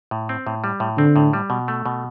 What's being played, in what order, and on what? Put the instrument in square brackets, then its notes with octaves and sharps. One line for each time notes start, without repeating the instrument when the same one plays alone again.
[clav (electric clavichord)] A2
C4
A2
G3
A2
[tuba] D3 [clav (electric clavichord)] C4
[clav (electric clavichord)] A2
G3
B2
A3
B2